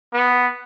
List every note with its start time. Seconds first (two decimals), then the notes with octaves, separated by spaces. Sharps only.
0.14 B3